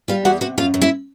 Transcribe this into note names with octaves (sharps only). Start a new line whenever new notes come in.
G3 F4 F5
E2 F#4 F#5
C3 F#4 F#5
F#2 F4 F5
F#2
E4 E5